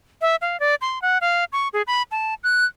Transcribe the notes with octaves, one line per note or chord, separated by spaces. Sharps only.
E5
F5
D5
C6
F#5
F5
C#6
G#4
B5
A5
F#6